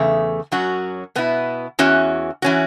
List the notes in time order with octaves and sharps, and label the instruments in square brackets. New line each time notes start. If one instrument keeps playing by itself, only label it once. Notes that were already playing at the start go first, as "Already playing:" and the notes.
Already playing: [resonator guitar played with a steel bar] E2 C#3 A3
F#2 F#3 C#4 F#4
B2 B3 E4
E2 E3 C#4 F#4
E3 C#4 F#4